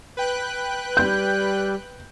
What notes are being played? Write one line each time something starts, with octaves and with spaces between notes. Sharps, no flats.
B4 G5 F#6
G3 G6